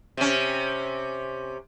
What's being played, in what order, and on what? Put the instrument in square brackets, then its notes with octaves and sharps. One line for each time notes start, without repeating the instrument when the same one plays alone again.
[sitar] C3 C#4